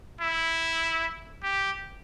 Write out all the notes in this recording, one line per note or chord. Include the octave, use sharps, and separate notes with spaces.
E4
G4